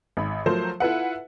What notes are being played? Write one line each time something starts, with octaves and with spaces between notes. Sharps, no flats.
G#1 B5
F3 F#3 A3 A#4 C5
E4 F4 A4 B4 E5 F#5